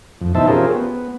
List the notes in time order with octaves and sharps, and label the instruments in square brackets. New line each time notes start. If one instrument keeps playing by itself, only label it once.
[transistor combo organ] F2
B2 E3 D#4 C5 E5 A5
C#4 F4 G4 G#4 A#4 C5
B3